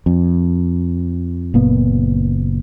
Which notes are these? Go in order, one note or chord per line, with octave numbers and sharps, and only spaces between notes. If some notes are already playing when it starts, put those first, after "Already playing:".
F2
F#1 A#2 B3